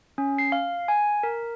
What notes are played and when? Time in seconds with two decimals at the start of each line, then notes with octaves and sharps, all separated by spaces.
0.18 C#4
0.38 C7
0.52 F5
0.88 G#5
1.23 A#4